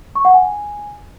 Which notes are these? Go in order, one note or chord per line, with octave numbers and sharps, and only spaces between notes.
C#6
F#5
G#5